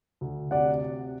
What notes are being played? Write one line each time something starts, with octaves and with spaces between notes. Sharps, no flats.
D2
C3 D5 F#5